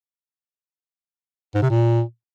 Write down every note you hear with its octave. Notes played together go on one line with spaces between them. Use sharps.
G#2
C3
A#2